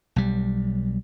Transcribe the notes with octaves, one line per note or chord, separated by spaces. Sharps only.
B1 G3